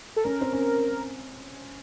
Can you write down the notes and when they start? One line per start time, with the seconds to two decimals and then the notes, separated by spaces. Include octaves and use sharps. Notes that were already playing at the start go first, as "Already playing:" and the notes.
0.16 A4
0.24 C#4 A#4
0.41 C4
0.53 C#4